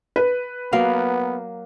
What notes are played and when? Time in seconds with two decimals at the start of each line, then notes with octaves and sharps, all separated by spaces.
0.16 B4
0.73 F#3 A#3 B3 F5